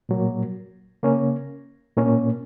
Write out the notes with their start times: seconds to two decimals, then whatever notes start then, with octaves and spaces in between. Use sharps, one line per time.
0.09 A#2 F#3 A#3
1.03 C#3 A#3 C#4
1.96 A#2 A#3 C#4